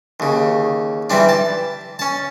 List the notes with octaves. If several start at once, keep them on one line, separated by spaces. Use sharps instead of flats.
D#2 C#3
E3 G3 C4 D4
A5
C#4 A5